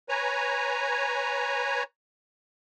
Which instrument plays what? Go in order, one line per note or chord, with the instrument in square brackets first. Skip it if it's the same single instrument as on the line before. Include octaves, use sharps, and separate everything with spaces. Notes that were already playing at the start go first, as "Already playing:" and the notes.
[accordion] B4 C#5 G#5 A#5